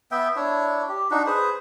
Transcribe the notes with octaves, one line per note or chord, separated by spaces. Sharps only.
B3 E5 G5
D4 E4 C#5
G4
D4 D#4 F#4
G#4 B4 C5